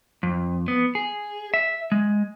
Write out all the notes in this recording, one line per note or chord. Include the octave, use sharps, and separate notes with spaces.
F2
B3
G#4
E5
G#3